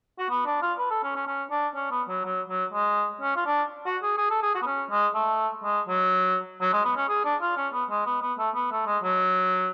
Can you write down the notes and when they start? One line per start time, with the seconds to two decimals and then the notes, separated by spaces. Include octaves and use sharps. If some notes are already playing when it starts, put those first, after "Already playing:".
0.18 F#4
0.30 B3
0.46 D4
0.62 F4
0.78 B4
0.90 A4
1.03 C#4
1.15 C#4
1.27 C#4
1.51 D4
1.75 C#4
1.91 B3
2.08 F#3
2.24 F#3
2.48 F#3
2.73 G#3
3.21 C#4
3.36 F4
3.46 D4
3.86 F#4
4.02 G#4
4.18 G#4
4.30 A4
4.42 G#4
4.55 F#4
4.62 B3
4.66 C#4
4.90 G#3
5.14 A3
5.64 G#3
5.88 F#3
6.61 F#3
6.73 G#3
6.85 B3
6.97 C#4
7.09 G#4
7.25 D4
7.42 F4
7.57 C#4
7.73 B3
7.90 G#3
8.06 B3
8.22 B3
8.38 A3
8.55 B3
8.71 A3
8.87 G#3
9.03 F#3